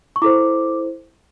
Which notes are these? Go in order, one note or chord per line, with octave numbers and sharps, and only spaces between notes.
C#6
E4 A4 C5 D6